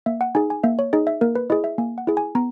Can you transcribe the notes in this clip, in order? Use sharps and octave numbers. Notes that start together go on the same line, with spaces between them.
A#3 E5
F#5
D#4 G#4 G#5
G#5
A#3 E5
C#5
D#4 G#4 D#5
E5
A#3 A#4
B4
E4 G#4 D#5
E5
A#3 G#5
F#5
E4 G#4
G#5
B3 A#5